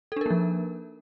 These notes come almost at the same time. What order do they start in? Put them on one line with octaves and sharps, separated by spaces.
A4 D4 A#4 A#3 F3